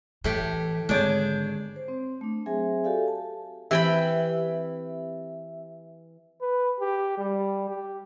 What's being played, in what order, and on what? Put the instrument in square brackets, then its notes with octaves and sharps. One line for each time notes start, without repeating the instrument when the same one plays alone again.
[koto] A2 A3 G4 [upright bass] E3
[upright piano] G#1 C#5 G6 [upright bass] D3 [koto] D4 G#4 D5
[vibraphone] C5
C4
A3 D4
F#3 C4 G#4 C5 E5 G#5
F#4 G4 A4 D5 F5 G#5
A5
[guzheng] E3 G5 B5 [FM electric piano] C4 G4 E5
[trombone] B4
G4
G3
G4